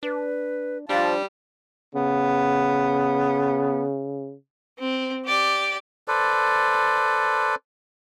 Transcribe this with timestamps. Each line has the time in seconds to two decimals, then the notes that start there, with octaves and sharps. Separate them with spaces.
0.03 D4 B4
0.89 F3 G3 D4 F4 C5 A5
1.95 C#3 B3
4.79 C4
5.26 G4 D5
6.08 A4 B4 C5 D5